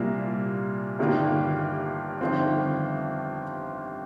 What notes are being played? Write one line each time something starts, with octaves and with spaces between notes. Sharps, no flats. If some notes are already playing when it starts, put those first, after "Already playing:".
Already playing: C2 A#2 G3 A#3 F4
G1 G2 D#3 A#3 F4
G1 F2 D#3 C4 F4